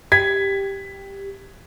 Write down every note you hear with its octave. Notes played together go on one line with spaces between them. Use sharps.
G4 G#6 B6